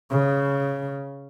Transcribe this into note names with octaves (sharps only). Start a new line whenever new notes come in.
C#3